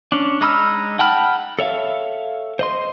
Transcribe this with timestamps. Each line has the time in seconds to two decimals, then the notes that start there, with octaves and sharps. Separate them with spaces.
0.12 C#4 D4
0.41 G#3 D#4 B5 E6 F6
0.99 F#5 G5 A5 B5 F6
1.59 A4 C#5 E5 F5
2.59 C5 D#5 C6